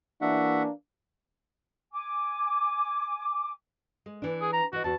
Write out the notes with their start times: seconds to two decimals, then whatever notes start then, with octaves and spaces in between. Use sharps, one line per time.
0.21 E3 A#3 D4 F#4 E5 F#5
1.93 G#5 D6
4.06 G#3
4.22 E3 D4
4.41 G#4
4.53 A#5
4.73 E3 F#4 D#5
4.84 E2 F#4 A5